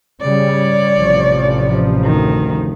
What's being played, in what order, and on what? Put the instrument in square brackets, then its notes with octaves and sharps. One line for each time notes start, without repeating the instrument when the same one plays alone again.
[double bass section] C#3 G3 [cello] C#5 D5
[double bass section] A1 C3 F3
[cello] D2 D#3